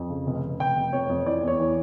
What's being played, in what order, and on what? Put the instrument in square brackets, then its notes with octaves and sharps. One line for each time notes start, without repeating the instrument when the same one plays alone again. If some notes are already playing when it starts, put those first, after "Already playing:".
Already playing: [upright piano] F2
C#3
F1
F1
F1 G5
F1
F2 C#5
F2
E3 D5
E2
C#5
E3